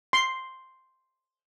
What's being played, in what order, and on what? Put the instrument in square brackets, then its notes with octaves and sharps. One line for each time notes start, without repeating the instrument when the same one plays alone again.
[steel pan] C6